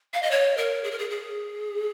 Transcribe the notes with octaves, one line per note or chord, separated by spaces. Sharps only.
F5
D#5
C#5
A#4
G#4
A#4
G#4
G#4